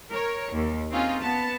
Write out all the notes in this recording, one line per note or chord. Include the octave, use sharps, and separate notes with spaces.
A#4 C#5
D#2
C4 C#4 D#4 F4 G#4
B3 A5